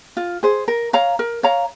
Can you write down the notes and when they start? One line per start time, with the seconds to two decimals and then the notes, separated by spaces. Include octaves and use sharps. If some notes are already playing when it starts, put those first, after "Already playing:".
0.17 F4
0.43 G#4 C5
0.68 A#4
0.93 C#5 F5 A#5
1.19 A#4
1.43 C#5 F5 A#5